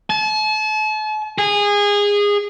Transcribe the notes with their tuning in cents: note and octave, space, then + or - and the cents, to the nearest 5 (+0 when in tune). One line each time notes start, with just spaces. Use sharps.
A5 -40
G#4 -20